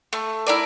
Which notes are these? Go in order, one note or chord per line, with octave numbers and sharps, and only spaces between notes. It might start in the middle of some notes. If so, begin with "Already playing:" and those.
A3
E4 A#4 D5